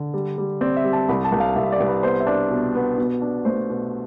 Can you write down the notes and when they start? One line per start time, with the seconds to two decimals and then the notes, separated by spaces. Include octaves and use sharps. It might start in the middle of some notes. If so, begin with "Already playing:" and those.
Already playing: D3
0.14 G3
0.38 G3
0.61 C4 D5
0.77 E5
0.84 G3
0.93 A5
1.08 C2 B5
1.24 A5
1.32 C2
1.40 F5
1.56 C2 E5
1.72 D5
1.80 C2
1.88 B4
2.03 B3 C5
2.20 E5
2.27 D4 D5
2.50 B2
2.75 B3
2.98 B2
3.22 D4
3.45 A3 C5
3.70 B2